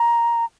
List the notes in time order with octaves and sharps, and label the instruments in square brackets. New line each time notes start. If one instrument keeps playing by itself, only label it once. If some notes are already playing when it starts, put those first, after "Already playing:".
Already playing: [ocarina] A#5